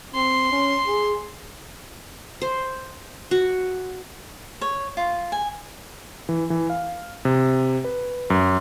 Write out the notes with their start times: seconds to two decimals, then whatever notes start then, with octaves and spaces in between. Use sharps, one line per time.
0.15 C4 C6
0.52 C#4
0.87 G#4
2.42 C5
3.31 F#4
4.61 C#5
4.97 F4
5.32 G#5
6.29 E3
6.50 E3
6.70 F5
7.25 C3
7.84 B4
8.30 F#2